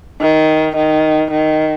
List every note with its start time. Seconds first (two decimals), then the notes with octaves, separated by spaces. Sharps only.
0.21 D#3
0.76 D#3
1.31 D#3